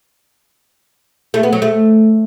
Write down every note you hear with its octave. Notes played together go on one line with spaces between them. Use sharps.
A3
B3
F#3
A3